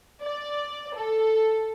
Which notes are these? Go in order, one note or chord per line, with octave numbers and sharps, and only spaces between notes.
D5
A4